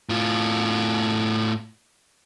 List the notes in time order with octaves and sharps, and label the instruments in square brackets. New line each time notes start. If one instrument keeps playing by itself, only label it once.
[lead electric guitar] A2 F4